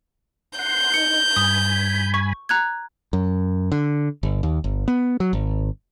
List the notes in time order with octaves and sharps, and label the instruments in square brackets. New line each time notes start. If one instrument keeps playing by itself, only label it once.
[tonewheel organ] F#5 C6 [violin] G6
[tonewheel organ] D#4 [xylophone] C#7
[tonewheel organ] G2 G#5 B5 [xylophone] D#6
[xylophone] C#6
A#5 F#6 G#6
[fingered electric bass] F#2
D3
G1
D#2
G1
B3
F#3
G#1